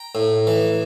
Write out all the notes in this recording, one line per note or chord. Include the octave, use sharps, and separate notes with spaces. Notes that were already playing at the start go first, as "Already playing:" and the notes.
Already playing: G5 A#5
A2
E3